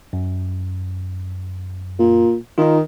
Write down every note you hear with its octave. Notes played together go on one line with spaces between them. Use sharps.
F#2
A#2
D#3 D#4 F4